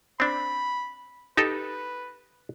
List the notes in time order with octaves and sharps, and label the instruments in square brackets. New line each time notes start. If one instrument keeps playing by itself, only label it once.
[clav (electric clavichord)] C4 D4 [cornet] B5
[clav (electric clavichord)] D#4 G4 A4 [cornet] B4